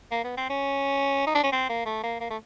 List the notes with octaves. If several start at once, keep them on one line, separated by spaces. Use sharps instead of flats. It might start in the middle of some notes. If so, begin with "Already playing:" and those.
A#3
B3
C4
C#4
D#4
D4
C#4
C4
A#3
A3
A#3
A#3
A3